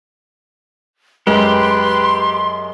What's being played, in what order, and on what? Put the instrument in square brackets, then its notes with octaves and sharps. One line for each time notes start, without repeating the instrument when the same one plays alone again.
[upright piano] F#2 G#3 [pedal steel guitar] G4 [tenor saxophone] B4 [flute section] C6